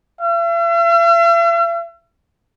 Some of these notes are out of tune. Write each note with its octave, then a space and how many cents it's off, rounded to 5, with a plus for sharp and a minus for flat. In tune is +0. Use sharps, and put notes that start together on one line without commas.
E5 +45